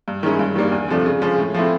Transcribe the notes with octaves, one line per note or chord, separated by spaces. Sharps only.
G2
D#3 G#3 C#4 E4
G2
D#3 G3 A#3 D4
E2
C3 F3 A3 D4
C#3
F3 G#3 C#4
A2
F3 A3 C4 E4